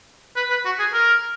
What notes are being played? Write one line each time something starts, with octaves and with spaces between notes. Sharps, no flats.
B4
B4
F#4
G#4
A#4